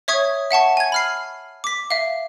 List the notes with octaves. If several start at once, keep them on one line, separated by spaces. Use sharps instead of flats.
C#5 E5 C#6 D#6 G#6
E5 F#5 A5 C#6
G#5 G#6
B5 F6 C7
D6 B6
E5 F5